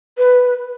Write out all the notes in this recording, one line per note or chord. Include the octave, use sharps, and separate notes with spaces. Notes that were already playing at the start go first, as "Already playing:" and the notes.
B4